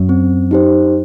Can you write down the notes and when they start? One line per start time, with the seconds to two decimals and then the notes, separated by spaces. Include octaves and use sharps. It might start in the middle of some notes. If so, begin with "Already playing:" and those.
Already playing: F#2 F#3
0.09 C4
0.51 D#4 G4 C5